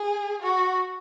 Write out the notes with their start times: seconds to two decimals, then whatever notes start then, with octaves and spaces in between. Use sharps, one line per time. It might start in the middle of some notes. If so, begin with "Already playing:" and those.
Already playing: G#4
0.42 F#4